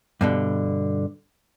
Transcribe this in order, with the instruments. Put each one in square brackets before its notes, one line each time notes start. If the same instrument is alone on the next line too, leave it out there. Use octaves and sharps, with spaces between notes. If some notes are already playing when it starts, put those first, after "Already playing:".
[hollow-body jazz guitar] G2 B2 D3